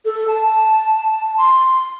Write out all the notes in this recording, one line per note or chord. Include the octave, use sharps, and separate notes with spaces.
A4
A5
C6